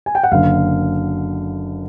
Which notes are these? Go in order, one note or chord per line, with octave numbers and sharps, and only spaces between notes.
G#5
G5
F#5
F#1 F#2 D3 F5